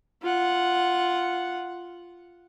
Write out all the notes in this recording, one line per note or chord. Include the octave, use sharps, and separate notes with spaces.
F4 F#5